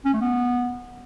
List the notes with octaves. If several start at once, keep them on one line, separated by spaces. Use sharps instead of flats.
C#4
A3
B3